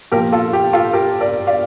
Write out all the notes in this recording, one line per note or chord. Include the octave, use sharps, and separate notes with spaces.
A#2 F3 A#3 G4 A#4
F4 A4
G4
F4 A4
G4 A#4
A#4 D5
D5 F5